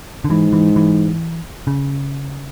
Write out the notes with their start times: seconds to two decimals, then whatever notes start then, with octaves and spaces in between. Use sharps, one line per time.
0.24 D3
0.30 G#2 E3
0.53 E3
0.76 E3
1.67 C#3